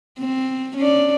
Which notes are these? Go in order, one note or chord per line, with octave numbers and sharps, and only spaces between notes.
C4
C#4 D4 D5